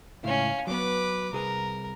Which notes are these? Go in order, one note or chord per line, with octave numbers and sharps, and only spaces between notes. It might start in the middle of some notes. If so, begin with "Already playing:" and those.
C#2 A2 C#4 E4 F5
F#3 B3 B4 D6
C2 G#4 A#4 B4